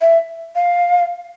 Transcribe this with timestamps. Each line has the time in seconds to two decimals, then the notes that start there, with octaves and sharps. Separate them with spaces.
0.01 E5
0.55 F5